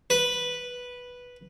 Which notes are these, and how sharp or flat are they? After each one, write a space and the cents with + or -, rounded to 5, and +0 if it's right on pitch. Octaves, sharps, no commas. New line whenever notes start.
B4 -5